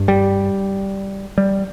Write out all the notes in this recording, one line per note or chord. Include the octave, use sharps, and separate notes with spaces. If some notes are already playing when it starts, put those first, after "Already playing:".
Already playing: G2
G3
G3